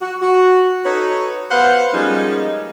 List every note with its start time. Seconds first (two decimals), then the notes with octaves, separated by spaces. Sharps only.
0.01 F#4
0.21 F#4
0.85 D#4 F#4 A4 B4 C#5
1.51 B3 G4 B4 C5 F5 F#5
1.94 F3 G3 G#3 A#3 C#4 D#4